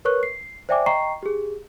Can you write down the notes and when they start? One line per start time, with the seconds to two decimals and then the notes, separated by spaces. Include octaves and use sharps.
0.05 A#4 B4 C#5 C#6 F#6
0.23 C7
0.69 C5 D5 E5 G5 G#5 D6
0.86 D#5 G5 A#5 C#6 C7
1.23 G4 G#4